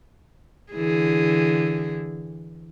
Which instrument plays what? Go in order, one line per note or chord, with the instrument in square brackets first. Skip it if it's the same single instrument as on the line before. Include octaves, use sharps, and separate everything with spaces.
[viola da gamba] D3 E3 G#4